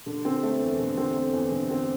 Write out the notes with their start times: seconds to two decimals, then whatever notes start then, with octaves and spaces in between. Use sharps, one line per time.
0.06 D3
0.25 C4
0.43 A3
0.61 E2
0.79 D3
0.98 C4
1.15 A3
1.33 E2
1.51 D3
1.70 C4